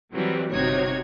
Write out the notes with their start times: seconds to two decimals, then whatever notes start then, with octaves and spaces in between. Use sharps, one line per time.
0.13 E3 F#3 G3 C4
0.51 G1 C3 D#4 F#4 C#5 G#6